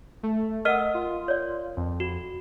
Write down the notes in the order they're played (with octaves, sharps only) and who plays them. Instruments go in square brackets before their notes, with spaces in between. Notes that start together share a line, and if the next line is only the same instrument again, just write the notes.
[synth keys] A3
[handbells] A#4 F6 [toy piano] D#5 F#5 E6
[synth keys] F4
[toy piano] C#5 D5
[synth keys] F2
[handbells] F#4